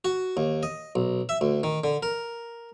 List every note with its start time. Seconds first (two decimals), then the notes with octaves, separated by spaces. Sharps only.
0.05 F#4
0.37 D#2
0.63 D#5
0.95 B1
1.29 E5
1.41 D2
1.63 D#3
1.84 D3
2.03 A#4